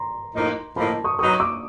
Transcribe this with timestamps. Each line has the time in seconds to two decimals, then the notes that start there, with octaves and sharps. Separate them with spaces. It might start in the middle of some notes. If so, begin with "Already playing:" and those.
Already playing: A#5 C6
0.34 A2 F3 A#3 D#4
0.76 A2 F3 A#3 D#4 A5 B5
1.04 C#6 D#6
1.19 F#3 B3 D#4 C#6 D#6
1.40 D6 E6